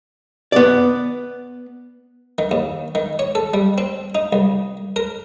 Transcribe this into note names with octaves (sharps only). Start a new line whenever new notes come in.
B3 D5
D#3
D#2
D#3
C#5
A4
G3
C4
D#4
C2
A#4